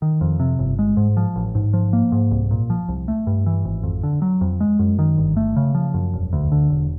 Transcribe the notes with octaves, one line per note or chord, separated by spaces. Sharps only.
D#3
F2
C3
G1
G#3
G#2
F3
A1
G#2
F3
A#3
G#2
C2
A#2
F3
C2
A3
G2
E3
G#1
F2
D3
F#3
F2
G#3
F#2
D#3
G1
A3
C#3
F3
F#2
E1
D2
D3
E1